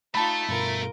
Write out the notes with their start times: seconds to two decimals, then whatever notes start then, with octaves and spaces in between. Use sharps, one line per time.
0.15 A3 D#4 F4 A5 B5
0.49 G2 B2 F4 A#4